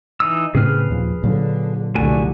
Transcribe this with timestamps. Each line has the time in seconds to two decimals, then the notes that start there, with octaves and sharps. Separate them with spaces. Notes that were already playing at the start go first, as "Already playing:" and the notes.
0.20 E3 D#4 E6
0.55 A2 C#3 C4 G#4 B4 F6
0.90 D#2 A#2 F3
1.24 A#2 D3 F#3
1.95 F1 C2 D3 A3 F#4 G#5